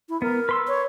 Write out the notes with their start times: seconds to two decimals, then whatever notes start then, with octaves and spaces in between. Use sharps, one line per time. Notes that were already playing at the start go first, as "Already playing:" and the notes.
0.09 E4
0.22 B3 A#4
0.49 B4 C6 E6
0.67 C#5